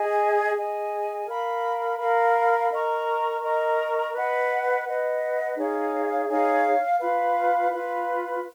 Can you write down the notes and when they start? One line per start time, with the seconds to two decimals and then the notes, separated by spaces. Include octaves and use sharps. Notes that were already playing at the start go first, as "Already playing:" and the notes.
Already playing: G#4 D#5 G#5
0.56 G#4 D#5 G#5
1.27 A#4 F5 B5
1.99 A#4 F5 B5
2.71 A#4 D#5 A#5 C#6
3.42 A#4 D#5 A#5 C#6
4.13 B4 D#5 F#5
4.85 B4 D#5 F#5
5.56 D#4 G#4 C#5 F5
6.29 D#4 G#4 C#5 F5
6.99 F4 B4 F5 B5
7.70 F4 B4 F5 B5